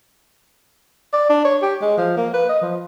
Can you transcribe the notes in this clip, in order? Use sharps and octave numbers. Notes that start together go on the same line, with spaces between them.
D5
D4
C#5
G4
G#3
F3
A#3
B4
D#5
F3